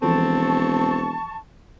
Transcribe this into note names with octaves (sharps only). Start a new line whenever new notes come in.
E1 E3 F3 C4 A4 A5 C#6